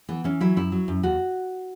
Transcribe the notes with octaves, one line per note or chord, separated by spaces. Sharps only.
E3 B3
E3 C#4
F#3 E4
F#2 E4
F#3
F#2
D#2 F#4